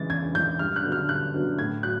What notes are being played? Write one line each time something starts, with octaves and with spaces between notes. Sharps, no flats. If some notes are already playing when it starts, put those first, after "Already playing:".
Already playing: C#3 E3 G#3 A6
E2 G#6
C#3 E3 G#3 G6
G2 F6
F#6
D3 F#3 B3
F6
G2 F#6
D3 F#3 B3
A2 G#6
F#3 F#6